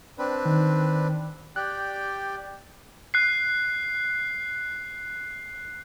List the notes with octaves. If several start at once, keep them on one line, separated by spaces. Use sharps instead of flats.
C4 D4 B4
D#3
G4 D5 G5 F#6
F#6 C7